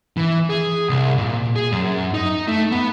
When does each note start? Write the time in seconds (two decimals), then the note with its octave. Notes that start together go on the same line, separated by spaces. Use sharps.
0.17 E3
0.50 G#4
0.89 C2
1.18 A#2
1.56 G#4
1.72 F#2
2.14 D#4
2.48 A3
2.71 B3